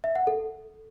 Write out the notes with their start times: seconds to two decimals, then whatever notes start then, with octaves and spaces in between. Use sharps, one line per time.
0.04 E5
0.15 F#5
0.27 A4